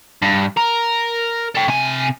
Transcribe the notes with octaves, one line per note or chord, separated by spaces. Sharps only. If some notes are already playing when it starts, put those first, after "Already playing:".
G2
A#4
A4 G5
C3 G#5